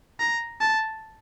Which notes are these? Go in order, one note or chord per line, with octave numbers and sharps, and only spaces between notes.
A#5
A5